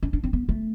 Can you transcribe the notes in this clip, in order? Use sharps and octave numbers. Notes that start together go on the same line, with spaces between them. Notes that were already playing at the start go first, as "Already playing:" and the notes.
C#4
D4
C4
B3
A3